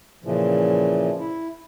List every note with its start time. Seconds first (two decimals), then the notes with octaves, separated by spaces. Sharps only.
0.24 A#2 C#3 E3 F3
1.20 E4